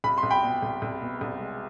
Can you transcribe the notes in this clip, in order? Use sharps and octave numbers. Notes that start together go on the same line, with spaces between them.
C2 B5
C6
C2
G5 B5
B2
C2
C2
B2
C2
G#3